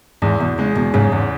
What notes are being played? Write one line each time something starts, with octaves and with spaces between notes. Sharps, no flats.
E2 G#2
E2 B2
C#3 G#3
E2 B2
G#2 C#3
E2 G#2